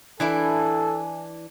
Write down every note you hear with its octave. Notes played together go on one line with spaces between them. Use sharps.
E3 D4 E4 A4 G#5